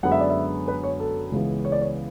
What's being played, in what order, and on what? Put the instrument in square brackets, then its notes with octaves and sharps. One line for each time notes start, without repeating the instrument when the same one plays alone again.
[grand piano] F#2 D3 G#3 B3 F#5
E5
D5
E5
B4
C#5
A4
C#2 C#3 E3 G#3 B3
C#5
D5
C#5